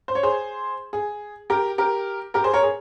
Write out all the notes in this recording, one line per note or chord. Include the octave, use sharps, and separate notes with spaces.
C5
C#5
G#4 C5
G#4
G4 A#4
G4 A#4
G4 A#4
G#4 C5
A#4 C#5
G#4